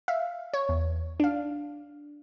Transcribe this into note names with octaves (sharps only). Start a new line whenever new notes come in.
E5 F5
C#5
E2
D4 F5